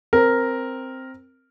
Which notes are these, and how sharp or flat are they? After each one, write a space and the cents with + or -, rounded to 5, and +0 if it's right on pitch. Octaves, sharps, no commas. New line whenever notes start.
C4 +0 A#4 +0